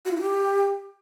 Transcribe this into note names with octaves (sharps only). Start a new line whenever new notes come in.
F#4
F4
E4
G4